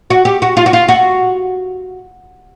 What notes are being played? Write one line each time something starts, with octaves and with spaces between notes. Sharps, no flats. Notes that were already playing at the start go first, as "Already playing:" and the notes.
F#4
G4
F#4
F4
F#4
F4
F#4